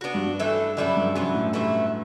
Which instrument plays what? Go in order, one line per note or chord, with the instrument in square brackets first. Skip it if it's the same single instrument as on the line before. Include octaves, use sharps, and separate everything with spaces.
[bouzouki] B3 D4 F#4
[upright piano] G2
G2
[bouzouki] E3 A3 D4 A4
[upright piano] F#2 [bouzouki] D3 G3 B3 E4
[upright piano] G2
[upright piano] F#2 [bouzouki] C3 E3 B3
[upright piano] A2
[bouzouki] C3 E3 A3 E4